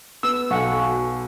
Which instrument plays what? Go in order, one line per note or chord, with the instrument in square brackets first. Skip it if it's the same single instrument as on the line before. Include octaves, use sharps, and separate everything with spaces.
[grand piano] B3 [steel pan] E6
[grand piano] B1 [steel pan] A4 F#5 [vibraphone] F5 G#5 C#6
[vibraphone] F#4